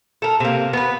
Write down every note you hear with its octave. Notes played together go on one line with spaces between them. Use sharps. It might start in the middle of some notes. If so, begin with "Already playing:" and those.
A4 A#4
C3 A#3
B3 B4